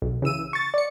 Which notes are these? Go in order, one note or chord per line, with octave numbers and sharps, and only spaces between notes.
B1
C#3 E3 E6 D#7
C#6 A6
D5 C#7